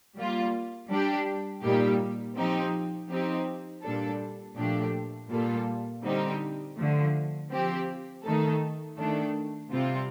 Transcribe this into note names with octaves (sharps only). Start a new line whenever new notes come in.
G3 A#3 F4
G3 D4 G4
A#2 G3 A#3 D#4 G4
F3 C4 D#4 G4
F3 C4 D#4 G4
A#2 G3 D4 A4
A#2 F3 A3 D4 G4
A#2 G3 A#3 F4 A4
D3 G3 C4 D#4 G4
D3 F3 A3
F3 C4 G4
D#3 A3 D#4 A4
D#3 A3 D4 A4
C3 G3 C4 F4